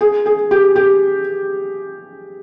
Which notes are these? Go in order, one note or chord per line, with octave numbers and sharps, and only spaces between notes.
G#4
G#4
G4
G4